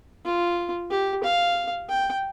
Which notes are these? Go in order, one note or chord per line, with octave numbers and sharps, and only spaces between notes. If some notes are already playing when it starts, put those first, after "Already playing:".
F4
G4
F5
G5